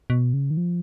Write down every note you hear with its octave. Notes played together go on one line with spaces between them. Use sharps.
B2
C#3
D#3
F3